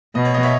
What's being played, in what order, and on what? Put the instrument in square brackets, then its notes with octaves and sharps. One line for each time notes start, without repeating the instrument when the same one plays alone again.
[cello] B2 [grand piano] D#5
[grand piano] C#5
D#5
C#5 E5